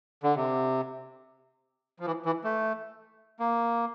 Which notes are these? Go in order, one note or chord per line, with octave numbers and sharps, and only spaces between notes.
D3
C3
F3
E3
E3
A3
A#3